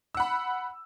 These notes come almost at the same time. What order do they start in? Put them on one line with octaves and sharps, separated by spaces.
E6 F#5 B5